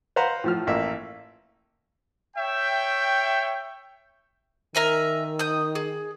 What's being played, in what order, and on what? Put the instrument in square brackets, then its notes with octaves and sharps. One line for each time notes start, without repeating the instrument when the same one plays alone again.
[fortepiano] B4 C5 F5 F#5 A#5
A2 F3 F6
A1 A#3 E5
[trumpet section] C#5 E5 G5
[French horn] D#3 [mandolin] A#4 E5 G#5
[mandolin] D#6 G6
G#4